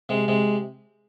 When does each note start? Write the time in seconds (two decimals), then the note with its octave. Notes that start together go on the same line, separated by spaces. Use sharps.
0.09 C3 G#3
0.28 C3 G#3